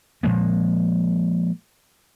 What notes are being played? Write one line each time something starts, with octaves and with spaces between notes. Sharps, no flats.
A#2 F3 G#3 A#3